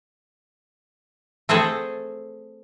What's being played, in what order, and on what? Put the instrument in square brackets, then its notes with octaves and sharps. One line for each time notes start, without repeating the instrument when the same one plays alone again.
[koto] A3 C4 G#4 A4